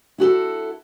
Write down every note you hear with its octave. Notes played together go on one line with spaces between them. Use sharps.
E4 F#4 G4 A4